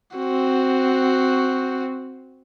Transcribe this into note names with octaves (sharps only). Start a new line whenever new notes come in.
C4 F#4